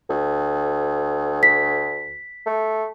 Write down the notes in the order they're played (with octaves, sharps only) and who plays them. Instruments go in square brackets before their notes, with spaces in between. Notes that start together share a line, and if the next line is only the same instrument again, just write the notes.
[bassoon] D2
[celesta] B6
[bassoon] A3